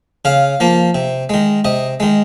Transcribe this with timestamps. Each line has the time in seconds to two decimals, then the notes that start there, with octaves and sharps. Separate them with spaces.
0.25 C#3 F5
0.60 F3 A#3
0.95 C3
1.29 D#3 G#3
1.65 C3 D#5
2.00 D#3 G#3